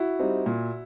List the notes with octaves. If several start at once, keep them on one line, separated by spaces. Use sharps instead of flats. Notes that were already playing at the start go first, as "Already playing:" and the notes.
Already playing: E4 F#4
G3 C4 D#4
A#2